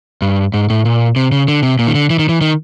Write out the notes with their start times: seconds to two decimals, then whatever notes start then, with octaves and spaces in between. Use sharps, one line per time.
0.22 G2
0.54 G#2
0.70 A2
0.85 A#2
1.16 C3
1.32 C#3
1.48 D3
1.63 C3
1.79 A#2
1.87 D#3
1.95 D3
2.10 E3
2.19 D#3
2.29 E3
2.41 D#3